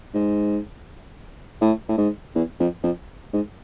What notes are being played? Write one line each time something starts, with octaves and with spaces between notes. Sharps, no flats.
G#2
A2
A2
G#2
E2
F2
F2
G#2